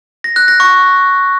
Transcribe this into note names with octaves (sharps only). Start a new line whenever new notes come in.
A#6
F#6
A#6
C#6